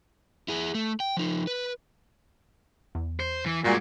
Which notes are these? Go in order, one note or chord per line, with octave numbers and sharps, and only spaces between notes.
E4 G#4
A3
G5
F3 D#4
B4
E2
C5
E3
G2 A#2 G#3 F#4 D5 G#5